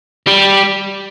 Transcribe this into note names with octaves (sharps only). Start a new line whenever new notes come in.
G3